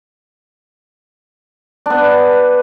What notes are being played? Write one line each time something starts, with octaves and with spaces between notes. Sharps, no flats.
B3 D4